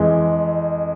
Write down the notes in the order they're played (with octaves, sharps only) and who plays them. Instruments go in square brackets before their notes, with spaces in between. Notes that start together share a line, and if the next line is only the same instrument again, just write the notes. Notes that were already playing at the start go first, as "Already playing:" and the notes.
Already playing: [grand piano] F2 E3 G#3